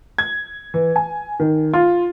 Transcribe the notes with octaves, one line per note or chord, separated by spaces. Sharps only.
G#6
E3
G#5
D#3
F4